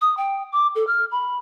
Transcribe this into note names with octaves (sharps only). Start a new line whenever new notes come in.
D#6
G5
D6
A4
F6
B5